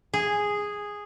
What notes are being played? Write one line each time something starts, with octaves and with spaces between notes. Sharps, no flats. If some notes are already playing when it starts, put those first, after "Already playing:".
G#4